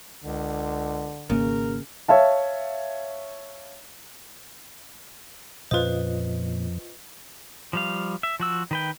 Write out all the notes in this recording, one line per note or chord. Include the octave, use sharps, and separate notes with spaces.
C#2 D3
G#1 C#3 A#3 A#4
C#5 E5 F5 A5
F2 A#2 C#4 F4 B4 C5 D#5
F3 G3 F5
E5
F3 F#4 E6
D#3 B4 G5